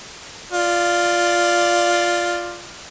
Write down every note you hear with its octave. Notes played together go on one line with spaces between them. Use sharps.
F4 D5